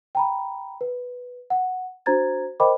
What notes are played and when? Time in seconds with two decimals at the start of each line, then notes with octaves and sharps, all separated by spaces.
0.15 G5 A#5 B5
0.81 B4
1.50 F#5
2.06 D4 F#4 C5 A#5 G#6 A6
2.60 A#4 C5 D#5 G5 B5 D6